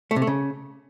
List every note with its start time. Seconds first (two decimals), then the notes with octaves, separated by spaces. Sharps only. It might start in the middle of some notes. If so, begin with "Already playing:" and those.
0.11 A3
0.16 C3
0.22 A3
0.27 C#3